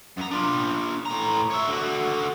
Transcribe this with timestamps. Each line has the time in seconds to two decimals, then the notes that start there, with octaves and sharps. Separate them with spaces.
0.17 F#2 A#5
0.31 D4 F4
1.06 A2 A#5
1.50 C#5 E5
1.67 D3 F#4